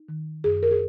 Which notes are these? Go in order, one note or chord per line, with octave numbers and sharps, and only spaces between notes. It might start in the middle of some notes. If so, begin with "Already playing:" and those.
Already playing: D#4
D#3
F#2 G#4
A#4
G#4